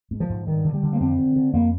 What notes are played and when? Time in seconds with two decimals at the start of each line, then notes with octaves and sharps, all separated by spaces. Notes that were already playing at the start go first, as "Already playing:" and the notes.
0.11 G#2
0.20 F3
0.29 G#2
0.47 G2 D#3
0.64 D3
0.74 G3
0.83 D3
0.93 A#3
1.00 F2 C4
1.18 D3
1.36 D3
1.53 F2 A#3